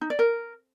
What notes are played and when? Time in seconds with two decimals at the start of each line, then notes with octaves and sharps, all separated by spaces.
0.01 D#4
0.10 D5
0.19 A#4